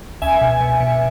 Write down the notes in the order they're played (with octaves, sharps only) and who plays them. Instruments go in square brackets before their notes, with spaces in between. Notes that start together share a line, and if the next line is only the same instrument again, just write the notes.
[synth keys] C#2 E5 G#5
B2
B2
B2